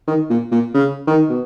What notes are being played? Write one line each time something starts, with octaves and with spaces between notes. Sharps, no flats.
D#3
A#2
A#2
C#3
D#3
B2